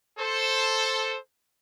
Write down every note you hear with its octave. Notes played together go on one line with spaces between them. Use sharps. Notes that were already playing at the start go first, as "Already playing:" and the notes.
A4 C5